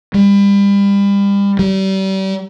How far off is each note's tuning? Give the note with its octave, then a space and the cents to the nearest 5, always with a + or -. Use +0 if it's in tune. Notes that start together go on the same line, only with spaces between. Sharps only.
G3 +35
G3 -35